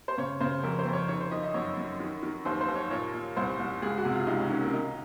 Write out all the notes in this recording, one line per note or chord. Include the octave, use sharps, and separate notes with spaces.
C5
C#3 C#5
C#3 C5
F2 A#4
C5
F2
C#5
D#3 C#5
C5
D#3 D#5
D#5
F#2 C#5
F#2
D#3
D#3
D#2 C5
C5
D#2
C#5
A#2 C#5
A#2
C2 C5
C2
C#2 G#4
F#4
C3
F4
C#2 D#4
C#4
D#3 C#4
A#3
D#3 D#4